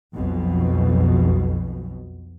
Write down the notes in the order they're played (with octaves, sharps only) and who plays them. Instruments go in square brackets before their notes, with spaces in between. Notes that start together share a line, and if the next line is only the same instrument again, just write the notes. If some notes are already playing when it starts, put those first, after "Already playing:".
[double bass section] B1 F2 B2